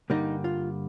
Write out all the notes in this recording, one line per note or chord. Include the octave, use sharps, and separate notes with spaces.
G2 D3 G3 A#3 D#4
F4